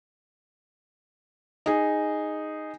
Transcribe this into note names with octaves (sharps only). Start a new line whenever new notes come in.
D#4 G#4